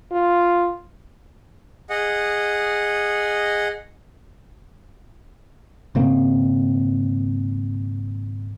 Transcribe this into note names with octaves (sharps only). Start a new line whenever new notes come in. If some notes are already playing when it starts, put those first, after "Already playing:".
F4
G#4 D#5 F#5
G#1 C#3 A#3 C4